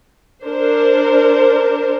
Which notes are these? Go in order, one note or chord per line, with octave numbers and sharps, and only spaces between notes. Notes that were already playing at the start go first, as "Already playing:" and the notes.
D4 A#4 C5